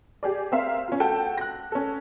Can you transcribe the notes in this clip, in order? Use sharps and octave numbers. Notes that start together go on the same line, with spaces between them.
G4 G#4 D5
C4 A#4 E5 F5
C#4 F4
F#4 A4 G5
F#6 A#6
C#4 A4